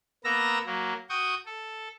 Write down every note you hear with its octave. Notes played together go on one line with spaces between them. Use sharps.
A#3 B3 A#5 E6 A#6
F#3 A#3
F#4 G5 C#6 D#6
A4